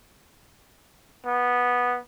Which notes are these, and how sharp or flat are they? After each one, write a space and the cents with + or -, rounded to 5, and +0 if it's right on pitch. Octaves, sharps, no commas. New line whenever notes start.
B3 -10